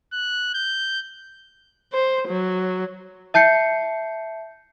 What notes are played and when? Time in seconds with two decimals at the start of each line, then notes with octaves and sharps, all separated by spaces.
0.13 F#6
0.54 G6
1.93 C5
2.28 F#3
3.34 E5 A5 G6 C7 C#7